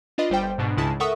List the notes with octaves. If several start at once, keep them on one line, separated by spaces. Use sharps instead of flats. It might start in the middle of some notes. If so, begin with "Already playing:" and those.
D4 F4 B4 D#5
G1 G3 C5 G5
G#2 B2 D4
C#2 C#3 G#3 E4 A5
A4 A#4 E5 F#5 C#6 D#6